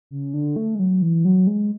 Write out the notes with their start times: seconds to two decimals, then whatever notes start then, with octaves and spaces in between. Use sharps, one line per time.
0.11 C#3
0.34 D3
0.56 A3
0.75 G#3
0.79 F#3
1.02 E3
1.25 F#3
1.47 G#3